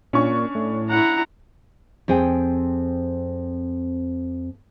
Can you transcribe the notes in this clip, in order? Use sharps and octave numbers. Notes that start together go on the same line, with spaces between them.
A#2 C#4 D4 C#6
A2
E4 F#5 A#5
F2 C4 G#4 G5